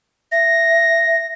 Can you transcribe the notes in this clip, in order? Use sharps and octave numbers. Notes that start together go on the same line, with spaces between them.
E5 A#6